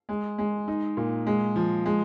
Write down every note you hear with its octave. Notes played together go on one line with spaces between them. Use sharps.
G#3
G#3
D#4
A#2
G#3
F3
G#3